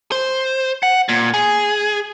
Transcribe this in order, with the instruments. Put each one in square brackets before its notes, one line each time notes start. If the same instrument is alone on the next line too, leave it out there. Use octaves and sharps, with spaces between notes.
[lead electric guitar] C5
F#5
A#2
G#4